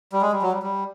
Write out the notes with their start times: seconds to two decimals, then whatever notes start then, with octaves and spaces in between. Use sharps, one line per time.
0.12 G3
0.22 G#3
0.32 G3
0.42 F#3
0.52 G3
0.63 G3